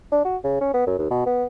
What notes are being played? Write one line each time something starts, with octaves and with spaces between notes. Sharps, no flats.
D4
F#4
C#3
C#4
B3
F#2
D#2
B2
B3